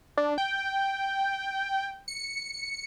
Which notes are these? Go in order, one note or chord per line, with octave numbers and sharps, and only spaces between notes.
D4
G5
C#7